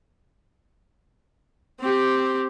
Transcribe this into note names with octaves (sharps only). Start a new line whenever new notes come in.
C4 G4